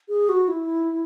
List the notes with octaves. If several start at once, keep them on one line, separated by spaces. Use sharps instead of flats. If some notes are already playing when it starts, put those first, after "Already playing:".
G#4
F#4
E4